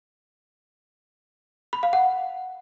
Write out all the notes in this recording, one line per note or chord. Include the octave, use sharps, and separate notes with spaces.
B5
F5
F#5